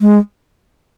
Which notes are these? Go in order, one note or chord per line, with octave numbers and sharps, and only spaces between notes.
G#3